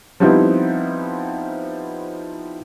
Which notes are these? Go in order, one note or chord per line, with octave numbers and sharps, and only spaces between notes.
F3 G3 B3 C4 D#4 E4